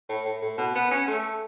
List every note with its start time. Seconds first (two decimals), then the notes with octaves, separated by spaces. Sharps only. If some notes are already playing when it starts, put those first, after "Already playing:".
0.09 A2
0.25 A2
0.41 A2
0.58 B2
0.75 B3
0.91 C#4
1.07 A3